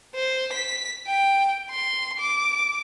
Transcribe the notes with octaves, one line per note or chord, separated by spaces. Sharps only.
C5
B6
G5
C6
D6